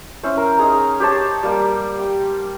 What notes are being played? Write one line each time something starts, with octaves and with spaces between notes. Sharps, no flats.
C#4 E4 C5
A#4
D#4 G#4 A#5
G4 C5 C#5 A5
G3 A#3 G4 D6
G5